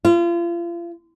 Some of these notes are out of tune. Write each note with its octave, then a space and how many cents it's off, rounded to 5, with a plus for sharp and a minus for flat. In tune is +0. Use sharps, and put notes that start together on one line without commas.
F4 -35